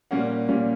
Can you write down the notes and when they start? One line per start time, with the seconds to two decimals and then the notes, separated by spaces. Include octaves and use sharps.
0.11 A#2 G3 A#3 C#4 F#5
0.48 A#2 G3 A#3 C#4